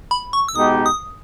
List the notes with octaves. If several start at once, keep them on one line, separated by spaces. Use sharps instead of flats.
B5
C#6
E6
B2 G#3 D#4 G4 D#6
D#6